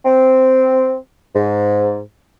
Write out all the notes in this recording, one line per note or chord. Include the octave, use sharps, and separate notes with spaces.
C4
G#2